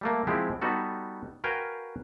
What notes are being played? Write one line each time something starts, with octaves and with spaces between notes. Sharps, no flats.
G3 A3 A#3
F3 G#3 C4 E4 G4
G3 B3 D#4 F#4 A4
F#4 A#4 B4 F5 G5 G#5